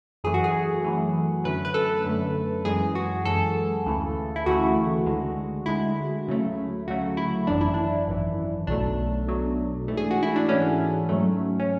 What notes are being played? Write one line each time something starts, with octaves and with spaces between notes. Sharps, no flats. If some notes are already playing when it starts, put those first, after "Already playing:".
F#2 E3 A3 G#4
F#4
G#4
F#2 E3 A3
F#2 D3 A3 B4
B4
A4
F#2 D3 A3
F#2 E3 G#3 G#4
F#4
F#2 E3 G#3 A4
D2 C#3 E3 A3
E4
D2 C#3 E3 A3 F#4
D2 D3 G#3
D2 D3 G#3 E4
D2 C#3 F#3 A3
D2 C#3 F#3 A3 F#4
E4
G#1 F#2 E3 D4
E4
D4
G#1 F#2 E3
B1 B2 F#3 A3 D4
B1 B2 F#3 A3
G#2 E3 A3
G#4
F#4
E4
D4
G#2 E3 A3 C#4
G#2 F#3 A3
C#4